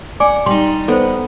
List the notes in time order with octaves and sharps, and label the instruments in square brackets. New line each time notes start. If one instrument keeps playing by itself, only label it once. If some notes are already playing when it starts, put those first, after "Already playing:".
[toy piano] D5 G#5 D6 [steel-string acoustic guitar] F#5
[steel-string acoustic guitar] G3 D#4 [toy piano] C6
[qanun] B3 [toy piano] A4 C5